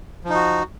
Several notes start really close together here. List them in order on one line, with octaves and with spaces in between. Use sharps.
F3 D#4 F#4